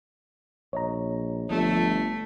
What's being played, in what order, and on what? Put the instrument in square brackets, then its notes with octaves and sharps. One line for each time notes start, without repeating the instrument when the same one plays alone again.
[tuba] A#1 [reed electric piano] C#5 D#5 A#5
[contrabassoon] G1 [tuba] F3 [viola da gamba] A3